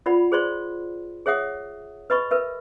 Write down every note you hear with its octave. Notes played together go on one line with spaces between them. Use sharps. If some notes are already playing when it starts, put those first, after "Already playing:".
F4 D5 F#5 B5
G#4 C5 D5 C6
G#4 C#5 E5 F#5 D#6
B4 D#5 B5 C#6
A#4 B4 E5